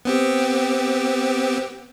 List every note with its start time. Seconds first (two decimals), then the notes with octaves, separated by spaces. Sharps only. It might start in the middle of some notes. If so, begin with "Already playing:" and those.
0.05 B3 C4 G4